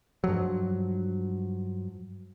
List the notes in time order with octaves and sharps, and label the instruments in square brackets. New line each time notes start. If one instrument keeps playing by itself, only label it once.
[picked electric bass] G2 F3 F#3